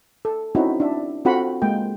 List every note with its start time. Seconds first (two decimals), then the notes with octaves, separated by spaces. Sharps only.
0.25 A4
0.55 C4 C#4 D#4 E4 F#4
0.80 D4 E5
1.25 C4 F4 F#4 A4 F#5 B5
1.62 G#3 A#3 G5